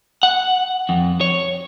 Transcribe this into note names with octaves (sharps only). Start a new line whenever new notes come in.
F#5
F2
C#5